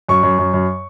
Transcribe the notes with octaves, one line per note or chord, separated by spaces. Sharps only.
F#2 C#6
F#2
F#2
F#2